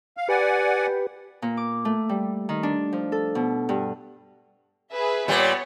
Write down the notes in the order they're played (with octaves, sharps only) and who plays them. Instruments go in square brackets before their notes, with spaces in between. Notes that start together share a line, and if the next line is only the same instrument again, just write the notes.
[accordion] F5
[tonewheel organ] G4 B4 [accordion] D5 F#5 G#5
[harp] A#2
D6
A3
G3
D#3
D4
F3
A4
B2
G2
[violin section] G#4 B4 E5
[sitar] A#2 G3 [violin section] B3 C#5